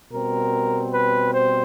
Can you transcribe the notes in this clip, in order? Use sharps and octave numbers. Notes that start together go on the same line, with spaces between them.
B2 G3 C4 A#4
B4
C5